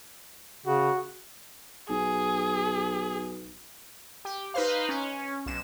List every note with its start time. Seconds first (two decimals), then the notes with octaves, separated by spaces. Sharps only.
0.66 C#3 F#4
1.90 B1 G#4
4.25 G4
4.54 D#4 B4 C5 F5
4.89 C#4
5.46 B1 E7